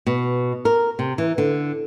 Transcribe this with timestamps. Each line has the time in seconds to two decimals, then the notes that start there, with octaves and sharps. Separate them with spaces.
0.06 B2
0.65 A#4
0.99 C3
1.18 E3
1.38 D3